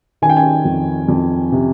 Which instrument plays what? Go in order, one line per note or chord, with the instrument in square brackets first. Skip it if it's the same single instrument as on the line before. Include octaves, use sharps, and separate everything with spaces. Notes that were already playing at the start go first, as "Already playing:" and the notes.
[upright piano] D#3 G#5
G5
G#5
F2
F2
C3